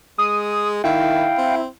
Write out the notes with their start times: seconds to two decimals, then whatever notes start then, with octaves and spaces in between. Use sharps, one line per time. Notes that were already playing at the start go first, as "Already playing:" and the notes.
0.18 G#3 D#6
0.84 D#3 E4 F5 G5
1.38 C4